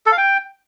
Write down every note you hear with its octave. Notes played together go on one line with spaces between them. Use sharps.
A4
F5
G5